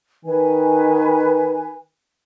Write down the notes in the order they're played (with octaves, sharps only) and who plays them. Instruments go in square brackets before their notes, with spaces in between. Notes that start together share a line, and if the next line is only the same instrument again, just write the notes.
[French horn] D#3 [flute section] B4 G#5